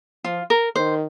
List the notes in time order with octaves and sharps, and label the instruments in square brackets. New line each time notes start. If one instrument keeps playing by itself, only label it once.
[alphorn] F3 [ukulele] F4
[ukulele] A#4
[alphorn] D#3 [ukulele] C5